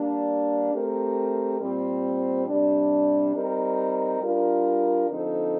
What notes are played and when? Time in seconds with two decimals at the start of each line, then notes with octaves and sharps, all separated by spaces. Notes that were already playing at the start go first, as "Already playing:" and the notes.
Already playing: G3 A#3 D4
0.73 A3 C4 G4 A#4
1.61 A#2 G3 C4
2.47 C3 G3 D4
3.35 G3 C4 D#4 A#4
4.22 G3 D4 F4 A#4
5.09 D3 F3 C4 D#4 A4